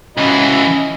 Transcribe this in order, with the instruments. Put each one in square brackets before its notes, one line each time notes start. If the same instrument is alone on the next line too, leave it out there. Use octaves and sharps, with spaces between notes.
[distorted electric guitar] C#2 E3 [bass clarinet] C#4 [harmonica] F#4 D#5 B5